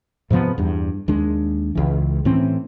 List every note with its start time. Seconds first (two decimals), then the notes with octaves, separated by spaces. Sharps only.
0.30 G#2 C3 F3 B3
0.58 E2 G2
1.08 D#2 G#3 D4
1.75 C#2 E3
2.25 A2 E3 C4 C#4